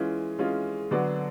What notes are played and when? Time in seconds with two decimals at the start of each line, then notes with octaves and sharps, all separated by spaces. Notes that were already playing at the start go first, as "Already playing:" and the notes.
Already playing: E3 G#3 C#4 F4
0.39 E3 G#3 C#4 F4
0.91 D3 F#3 B3 D4 F#4